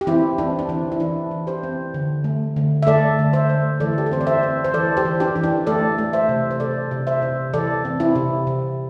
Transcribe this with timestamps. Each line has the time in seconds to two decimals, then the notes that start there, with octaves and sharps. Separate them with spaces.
0.01 G4
0.07 E3 C4 E4
0.38 C4 D4
0.59 D4
0.69 E3 C4
0.92 E4
1.00 E3 D4
1.31 E3
1.47 G4 C5
1.63 C4
1.94 D3
2.24 A3
2.56 D3
2.83 E5
2.87 A3 A4 D5
3.19 D3
3.33 C5 E5
3.50 A3
3.80 E3 A4 D5
3.98 G4
4.06 A4
4.12 C4 C5
4.21 D5
4.27 C5 E5
4.43 C4
4.64 C5
4.74 E3 A4 D5
4.97 G4 C5
5.05 E3
5.20 D4 G4
5.36 E3
5.43 D4
5.67 A3 A4 D5
5.98 A3
6.13 C5 E5
6.29 C3
6.51 C5
6.60 C3 A4 D5
6.91 C3
7.07 C5 E5
7.22 C3
7.53 E3 A4 D5
7.85 C4
8.00 C4 E4
8.15 C3
8.47 C3